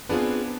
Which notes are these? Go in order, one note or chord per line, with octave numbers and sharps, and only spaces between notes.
B3 C4 D4 F4 G#4 B4